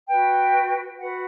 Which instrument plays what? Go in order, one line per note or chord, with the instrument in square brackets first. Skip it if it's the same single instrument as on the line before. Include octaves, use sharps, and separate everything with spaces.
[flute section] F#4 B4 G5
F#4 B4 F#5